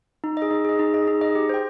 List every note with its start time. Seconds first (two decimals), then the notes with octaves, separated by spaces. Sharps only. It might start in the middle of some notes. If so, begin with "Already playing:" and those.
0.24 D#4
0.37 G#4 D#5
0.51 D#4
0.65 G#4 D#5
0.79 D#4
0.94 G#4 D#5
1.08 D#4
1.21 G#4 D#5
1.35 G4
1.49 C5 G5